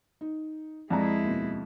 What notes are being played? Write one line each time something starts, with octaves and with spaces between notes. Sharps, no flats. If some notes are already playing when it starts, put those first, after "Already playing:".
D#4
F2 G#3 E4 D5 E5 A#5
D#2 B2